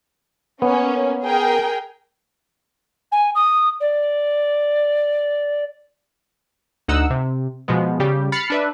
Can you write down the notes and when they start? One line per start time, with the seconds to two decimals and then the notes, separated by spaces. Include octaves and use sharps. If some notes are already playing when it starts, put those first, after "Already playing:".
0.62 A#3 B3 C#4
1.23 G#4 A#4 G5
3.11 G#5
3.34 D#6
3.80 D5
6.88 D2 D#4 F#5 E6
7.10 C3
7.68 B2 F3 G#3 B3
8.00 C#3 G3 G4
8.32 B5 F6 A6 C7 C#7
8.50 D4 B4 E5